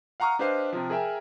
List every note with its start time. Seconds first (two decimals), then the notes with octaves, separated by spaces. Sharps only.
0.20 F5 F#5 A#5 C#6 D#6 F6
0.39 D4 G4 B4 C5 D#5 F5
0.73 C3 F3
0.90 G#4 A#4 E5 G5 G#5